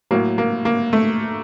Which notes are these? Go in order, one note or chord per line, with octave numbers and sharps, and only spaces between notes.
A2 F#3 A#3
A#3
A#3
A3